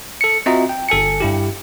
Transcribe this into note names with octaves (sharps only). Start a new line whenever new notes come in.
A4 C#7
C4 F4 F#4 D#5 E5 A#5
G5
G1 A4 G#5 C#7
G2 E4 G4